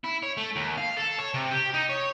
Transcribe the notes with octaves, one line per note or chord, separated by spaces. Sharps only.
E4
C#5
A3
D#2
F5
A4
C#5
C3
G4
D#4
C#5